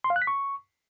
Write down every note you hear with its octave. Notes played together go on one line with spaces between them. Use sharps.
C6
F5
F#6
B6
C#6